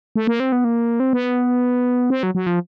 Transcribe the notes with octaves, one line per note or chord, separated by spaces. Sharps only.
A3
A#3
C4
B3
A#3
C4
B3
C4
F#3
F#3
F3